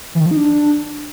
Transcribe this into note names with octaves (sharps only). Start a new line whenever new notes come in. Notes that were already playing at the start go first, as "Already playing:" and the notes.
E3
D#3
F3
D#4
D4